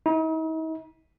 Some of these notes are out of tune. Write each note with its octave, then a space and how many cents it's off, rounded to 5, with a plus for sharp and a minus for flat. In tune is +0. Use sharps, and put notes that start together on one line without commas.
D#4 +45